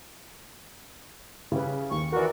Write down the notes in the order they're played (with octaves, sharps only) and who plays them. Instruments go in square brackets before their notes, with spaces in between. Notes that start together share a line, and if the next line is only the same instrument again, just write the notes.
[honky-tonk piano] C#3 [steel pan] E4 G4 B4
[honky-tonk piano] D#2 [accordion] C#6
[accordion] E3 F#4 [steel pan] A#4 D5